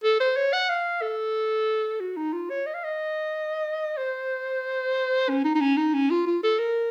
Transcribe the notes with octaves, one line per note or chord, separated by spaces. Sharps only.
A4
C5
C#5
F#5
F5
A4
F#4
D#4
F4
C#5
D#5
F5
D#5
C5
C#4
D#4
D#4
C#4
D#4
C#4
F4
F4
A4
A#4